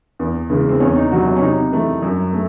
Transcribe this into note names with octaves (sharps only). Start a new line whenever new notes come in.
E2
C#3 E3 G#3
C4
E2 C#4
D#4
C3 F#3 F#4
C#4
C#4
C3 D#4
E3 A3
F#2
A3